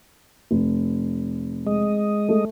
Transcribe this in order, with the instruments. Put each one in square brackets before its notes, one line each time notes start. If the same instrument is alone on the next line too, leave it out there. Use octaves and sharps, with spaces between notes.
[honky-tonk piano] F1
[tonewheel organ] G#3 D#5
[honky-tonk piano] A3